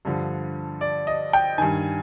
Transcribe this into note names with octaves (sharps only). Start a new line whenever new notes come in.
G2 D3 F3
D5
D#5
G5
G2 D#3 G#5